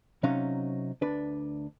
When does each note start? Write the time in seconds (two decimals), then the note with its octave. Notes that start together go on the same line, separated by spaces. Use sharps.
0.23 C3 F#3 C#4 D#4 C#5 F5
1.01 D2 D4 B4